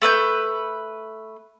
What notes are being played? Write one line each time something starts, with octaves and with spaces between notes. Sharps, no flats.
A3 B4 G5 G6